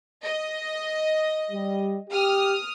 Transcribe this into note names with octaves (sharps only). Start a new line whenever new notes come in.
D#5
G3
G4 D#6 F6